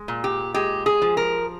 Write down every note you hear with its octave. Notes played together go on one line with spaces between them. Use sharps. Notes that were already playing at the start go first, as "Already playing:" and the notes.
Already playing: G#3
A#2
G4
G#3 G4
G#4
F3
A#4